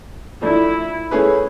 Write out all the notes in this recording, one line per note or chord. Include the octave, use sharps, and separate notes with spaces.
F3 A3 D4 E4
A3 C#4 E4 G#4 B4